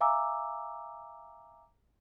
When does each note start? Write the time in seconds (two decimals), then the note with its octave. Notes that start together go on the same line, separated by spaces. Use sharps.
0.01 E5 F5 G#5 A#5 D6 E6